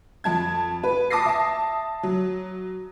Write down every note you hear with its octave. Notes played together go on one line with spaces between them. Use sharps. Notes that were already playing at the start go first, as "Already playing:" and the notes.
F2 A5 G#6
B4
A5 D6 D#6 A#6 C7
E5 A5
F#3